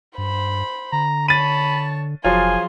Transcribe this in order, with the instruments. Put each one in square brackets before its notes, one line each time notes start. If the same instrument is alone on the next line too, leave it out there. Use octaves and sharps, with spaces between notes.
[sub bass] G2 [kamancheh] C5 B5
[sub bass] D3 [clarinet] A#5
[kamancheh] C#5 A5 [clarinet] B5 [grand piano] A6 D#7
[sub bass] F1 [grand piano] F3 F#3 F4 [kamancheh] G#4 C6 [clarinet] G#5